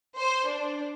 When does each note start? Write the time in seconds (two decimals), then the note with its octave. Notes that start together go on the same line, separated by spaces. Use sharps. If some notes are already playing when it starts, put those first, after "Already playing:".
0.18 C5
0.48 D4